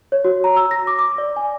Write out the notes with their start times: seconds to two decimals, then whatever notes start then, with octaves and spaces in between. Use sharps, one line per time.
0.12 C#5
0.25 F#4
0.44 A#5
0.56 E6
0.71 A#6
0.87 D6
0.99 D6
1.18 D5
1.36 G#5